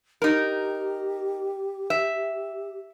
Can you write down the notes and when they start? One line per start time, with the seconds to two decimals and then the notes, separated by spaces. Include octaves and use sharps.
0.22 D#4 G4 A#4
1.90 E5